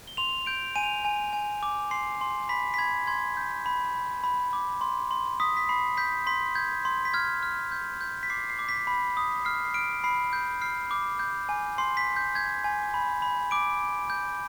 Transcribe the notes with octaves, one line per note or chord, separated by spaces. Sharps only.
G7
C6 F7
G6 D7
G#5 D#7
F7
D#7
G#5
G#5
D6
C6 C7
C6
B5 B6
B6
B5 G#6
C6 G#6
G6
B5
B5
B5
D6
C6
C6
D#6 B6
B6
B5 C7
G6 B6
C6 B6
G6 G#6
C6
B6
F6 G#6
F6
G6
G6
B6
D6 C7
C7
D6
B6
B5
D#6
F6 C7
C7
F6 D7
B5 C7
G6
F6 C7
D6
G6
G#5
C6 C7
B6
C6
G6
G6 G#6
G#5
B5
B5
D6 D7
D6
G6